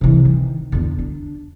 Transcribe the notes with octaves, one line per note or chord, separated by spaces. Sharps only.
C3 E3
D#3
E2 D3
D4